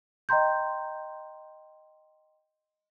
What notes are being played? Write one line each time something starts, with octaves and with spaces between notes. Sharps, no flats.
D#5 G5 A#5 C6 G6